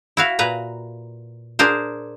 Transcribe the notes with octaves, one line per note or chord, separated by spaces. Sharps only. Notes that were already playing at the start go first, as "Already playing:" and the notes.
E4 F#4 F5
A#2 B4 A#5
D4 G#4 A#4 C5